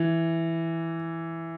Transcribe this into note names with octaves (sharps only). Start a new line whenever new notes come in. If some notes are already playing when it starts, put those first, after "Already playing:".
Already playing: E3